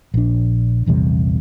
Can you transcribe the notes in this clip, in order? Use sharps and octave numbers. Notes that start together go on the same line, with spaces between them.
A#1 D4
A#1 E2 C3 G3